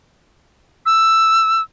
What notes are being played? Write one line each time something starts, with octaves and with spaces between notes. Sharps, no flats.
E6